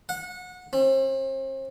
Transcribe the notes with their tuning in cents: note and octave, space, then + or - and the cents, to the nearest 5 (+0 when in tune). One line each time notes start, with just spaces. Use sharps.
F#5 -25
C4 +40